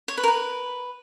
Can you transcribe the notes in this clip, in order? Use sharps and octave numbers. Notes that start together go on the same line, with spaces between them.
C#5
B4
A#4
B4